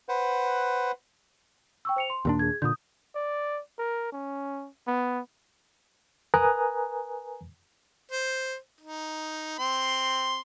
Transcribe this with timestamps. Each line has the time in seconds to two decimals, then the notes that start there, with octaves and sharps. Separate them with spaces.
0.09 B4 C5 F#5
1.85 G5 C#6 E6
1.96 C5 C#7 F7
2.10 C6
2.25 D#2 A#2 D4
2.39 G#4 G#6
2.62 A#2 D3 D#6 G6
3.15 D5
3.79 A#4
4.12 C#4
4.87 B3
6.34 A#4 B4 G#5 A#5 D#6 F#6
8.12 C5
8.81 D#4
9.59 C4 C6